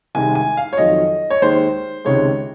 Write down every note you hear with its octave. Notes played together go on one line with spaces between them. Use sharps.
C2 C3 D#3 G#3 G#5
G#5
F5
C#5
F2 D#3 F#3 D#5
C#5
D#2 D#3 G#3 C5
C#2 C3 D#3 G#3 C#5